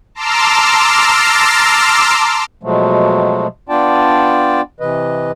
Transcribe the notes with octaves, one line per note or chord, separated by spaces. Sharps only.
A5 A#5 C6 D6 E6 F6
B2 F3 F#3 G#3 A3
B3 D4 F4 D5 G5 A5
C3 E3 B4 D#5